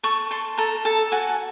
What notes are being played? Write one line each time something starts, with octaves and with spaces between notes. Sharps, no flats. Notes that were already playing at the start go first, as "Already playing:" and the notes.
A4 C#6
A4 C6
A4 A#5
A4 A5
F#4 G#5